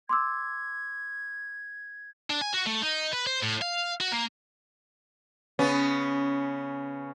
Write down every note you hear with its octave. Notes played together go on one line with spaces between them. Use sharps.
C6 D6 E6 G#6
D4
G#5
F#4
A3
D#4
B4
C5
A2
F5
F#4
A#3
C#3 B3 C#4